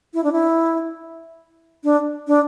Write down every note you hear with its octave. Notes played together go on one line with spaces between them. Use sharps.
E4
D4
E4
D4
D4